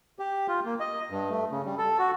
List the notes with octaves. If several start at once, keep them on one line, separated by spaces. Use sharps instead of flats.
G4
F4
A#3
D#5
G2
A3
C#3
G3
A4
F#4